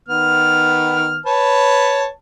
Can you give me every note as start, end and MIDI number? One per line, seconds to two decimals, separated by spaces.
0.08 1.19 51
0.08 1.19 59
0.08 1.19 89
1.26 2.08 71
1.26 2.08 73
1.26 2.08 81